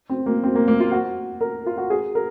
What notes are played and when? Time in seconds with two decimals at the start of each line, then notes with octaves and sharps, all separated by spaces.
0.09 C4
0.26 A#3
0.43 C4
0.55 A#3
0.68 A#3
0.80 F4
0.91 F#4
1.41 A#4
1.66 F4
1.77 F#4
1.90 G#4
2.15 A#4